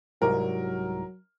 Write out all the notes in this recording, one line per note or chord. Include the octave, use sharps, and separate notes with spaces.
C2 G#2 F#3 A#4